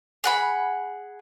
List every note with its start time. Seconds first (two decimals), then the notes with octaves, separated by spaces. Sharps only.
0.24 G#4 F#5 B5